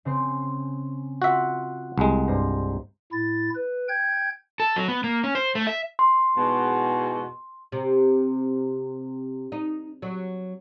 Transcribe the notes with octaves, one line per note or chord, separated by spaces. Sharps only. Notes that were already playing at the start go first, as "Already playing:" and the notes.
C#3 C4 C6
F4 F#4 E5 F#5
C2 G#3
G2 C5 A#5
A2 E4 A6
B4
G5 G6 G#6
A4
F#3
B3
A#3
C#4
C5
A3
E5
C6
E2 G#2 B2
C3
D#4
F#3